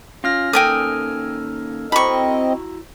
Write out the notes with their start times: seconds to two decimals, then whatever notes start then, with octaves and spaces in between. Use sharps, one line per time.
0.24 C#4 F4 F6 A#6
0.53 D#3 A#3 C#4 A4 G5 G#5 D#6 F6
1.92 C4 E4 F#4 D#5 A#5 B5 C#6